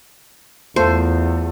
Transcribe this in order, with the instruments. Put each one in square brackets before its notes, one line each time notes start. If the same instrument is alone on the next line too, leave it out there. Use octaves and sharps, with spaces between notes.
[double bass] E2 [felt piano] A3 F4 A4 [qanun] C5